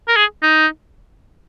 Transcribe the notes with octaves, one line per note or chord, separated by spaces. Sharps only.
A#4
G#4
D#4